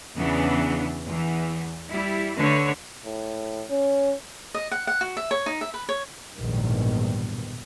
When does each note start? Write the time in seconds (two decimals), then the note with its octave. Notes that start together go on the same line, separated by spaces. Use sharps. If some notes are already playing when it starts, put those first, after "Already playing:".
0.16 E2 C#3 E3 B3 D4
1.08 E2 E3
1.90 G3 E4
2.37 D3 A3 B4 C#5
3.05 A2
3.70 C#4
4.54 D#5
4.71 F#5
4.87 F#5
5.01 F#4
5.17 E5
5.31 C#5
5.46 D#4
5.61 E5
5.74 B4
5.89 C#5
6.36 A#1 E2 G#2 B2 D#3 G3